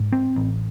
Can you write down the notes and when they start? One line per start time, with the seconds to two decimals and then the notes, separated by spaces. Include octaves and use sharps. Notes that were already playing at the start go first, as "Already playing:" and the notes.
Already playing: G#2
0.12 C4
0.36 A1